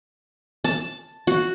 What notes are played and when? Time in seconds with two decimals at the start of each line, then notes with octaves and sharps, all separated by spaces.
0.64 A5
1.27 F#4